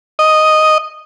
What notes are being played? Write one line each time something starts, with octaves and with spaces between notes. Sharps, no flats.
D#5